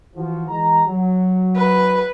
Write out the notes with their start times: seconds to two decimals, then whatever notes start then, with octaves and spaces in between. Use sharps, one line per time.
0.15 E3 F3 F#4
0.48 E3 G#3 A#5
0.86 F#3 F#4
1.56 B4